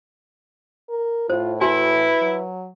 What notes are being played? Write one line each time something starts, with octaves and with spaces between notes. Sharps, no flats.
A#4
A2 F4 C5
E4 F#4 B4 G#5
F#3